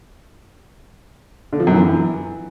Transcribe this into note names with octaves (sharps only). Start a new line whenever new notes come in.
D3
F3
F#2
E3